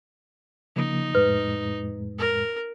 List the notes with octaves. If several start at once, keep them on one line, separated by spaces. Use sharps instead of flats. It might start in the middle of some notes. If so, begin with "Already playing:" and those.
C#3 F3 A#3 D#4
F2 A2 G#3 B4
A#4